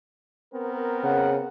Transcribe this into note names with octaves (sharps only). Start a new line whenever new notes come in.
B3 C4 A#4
C#3 F#5